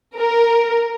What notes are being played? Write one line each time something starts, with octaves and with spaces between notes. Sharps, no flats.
A#4